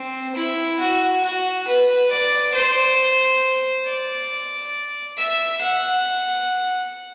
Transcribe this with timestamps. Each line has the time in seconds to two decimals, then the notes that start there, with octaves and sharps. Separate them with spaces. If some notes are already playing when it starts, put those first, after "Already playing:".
Already playing: C4
0.35 E4
0.79 F#4
1.23 F#4
1.67 B4
2.10 D5
2.54 C5
3.85 D5
5.17 E5
5.61 F#5